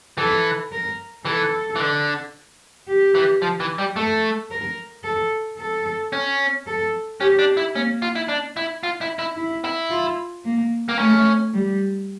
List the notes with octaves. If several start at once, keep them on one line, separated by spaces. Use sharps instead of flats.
E3 A4
A#4
E3 A4
E3
D3
G4
E3
F3
E3
G3
A3 A4
A#4
A4
A4
C#4
A4
C#4 G4
D4
E4
A#3 C#4
F4
E4
D4
E4
F4
E4
E4
E4
E4
F4
A#3
A#3
A3 C#4
G3